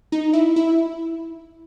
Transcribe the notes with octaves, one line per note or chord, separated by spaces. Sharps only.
D#4
E4
E4